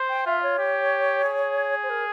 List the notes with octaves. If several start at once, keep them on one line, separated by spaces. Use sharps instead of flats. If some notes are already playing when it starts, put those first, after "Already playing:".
Already playing: C5
G5
F4 E5
C#5
G4
G#4
C5
A#4